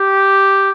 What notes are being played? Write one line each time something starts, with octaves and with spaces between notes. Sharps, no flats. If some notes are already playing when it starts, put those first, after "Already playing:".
Already playing: G4